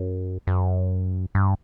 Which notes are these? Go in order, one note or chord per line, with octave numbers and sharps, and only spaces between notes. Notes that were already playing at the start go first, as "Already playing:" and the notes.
Already playing: F#2
F#2
G2